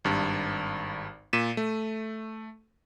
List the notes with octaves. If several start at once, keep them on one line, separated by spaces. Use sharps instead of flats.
G#1 G2
A#2 B6 D#7 E7
A3